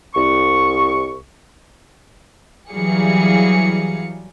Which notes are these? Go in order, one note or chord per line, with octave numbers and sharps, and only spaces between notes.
C2 C#6
E3 F#3 G3 G#4 F5 C#7